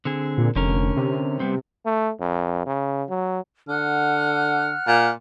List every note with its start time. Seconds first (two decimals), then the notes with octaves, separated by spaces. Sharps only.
0.05 D3 C4 G#4
0.38 A#2
0.56 F1 D3 C#4 A#4
0.96 C3
1.40 G3 B3 C4
1.86 A3
2.20 F2
2.66 C#3
3.10 F#3
3.68 D3 F#5 F6 F#6
4.88 A#2